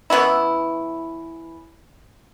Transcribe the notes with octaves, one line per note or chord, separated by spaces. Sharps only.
E3 B3 C#4 E4